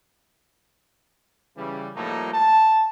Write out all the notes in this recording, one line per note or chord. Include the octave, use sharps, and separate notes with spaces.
C#3 E3 G3
A2 F3 G3 A3 A#3 D#4
A5